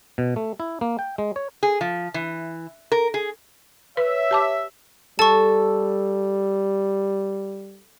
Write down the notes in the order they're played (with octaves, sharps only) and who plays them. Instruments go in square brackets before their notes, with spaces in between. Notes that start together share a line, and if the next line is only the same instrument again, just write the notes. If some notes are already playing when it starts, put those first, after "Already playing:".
[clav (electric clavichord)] B2
A3
E4
A#3
G5
G#3
C#5
[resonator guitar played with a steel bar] G#4
F3
E3
A#4
G#4
[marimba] B4 [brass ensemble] C#5 E5
[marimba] G4 A5 D6
[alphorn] G3 [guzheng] A4 [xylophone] A5 C#6